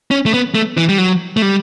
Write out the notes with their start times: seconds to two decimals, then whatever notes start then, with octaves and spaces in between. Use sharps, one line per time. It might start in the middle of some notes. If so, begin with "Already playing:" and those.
0.11 C#4
0.26 A3
0.34 B3
0.55 A3
0.78 E3
0.89 G3
0.98 F#3
1.37 A3
1.42 G3